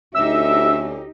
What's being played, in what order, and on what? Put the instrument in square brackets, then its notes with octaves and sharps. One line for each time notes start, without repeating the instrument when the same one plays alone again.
[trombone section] D2 C#4 [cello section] D#4 G4 [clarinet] E5 [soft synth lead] E6